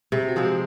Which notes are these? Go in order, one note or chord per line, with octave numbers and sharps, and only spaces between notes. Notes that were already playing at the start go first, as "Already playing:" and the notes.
C3 G#4
F#4
F3 G#3 C4
G4